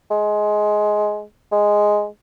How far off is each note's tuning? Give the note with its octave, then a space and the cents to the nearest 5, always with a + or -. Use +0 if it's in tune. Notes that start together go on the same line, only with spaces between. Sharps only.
G#3 +15
G#3 +0